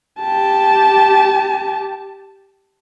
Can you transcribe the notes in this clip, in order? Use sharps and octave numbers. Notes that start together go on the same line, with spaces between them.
G4 A5